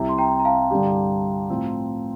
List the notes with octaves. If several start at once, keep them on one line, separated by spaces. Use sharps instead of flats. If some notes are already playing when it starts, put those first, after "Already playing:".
Already playing: C2 C3 G3 C4 E4
C6
G5 A#5
A#5
F5 A5
G2 D3 G3 D4 G4
A2 F3 C4